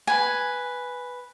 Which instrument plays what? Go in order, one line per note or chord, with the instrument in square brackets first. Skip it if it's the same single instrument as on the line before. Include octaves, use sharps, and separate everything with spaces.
[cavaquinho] B4 G#5